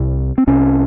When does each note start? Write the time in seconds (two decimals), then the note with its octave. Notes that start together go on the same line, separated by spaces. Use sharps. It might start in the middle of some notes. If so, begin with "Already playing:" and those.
Already playing: C2 C3
0.38 C4
0.47 C2 C3 C#4